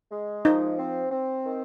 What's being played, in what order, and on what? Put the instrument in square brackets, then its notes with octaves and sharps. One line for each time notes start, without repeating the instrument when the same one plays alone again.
[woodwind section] G#3
[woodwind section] F3 [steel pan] D#4
[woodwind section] C4
C4
D#3